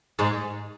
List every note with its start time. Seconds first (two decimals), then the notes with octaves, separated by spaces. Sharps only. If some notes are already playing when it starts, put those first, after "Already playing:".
0.19 G#2 G#3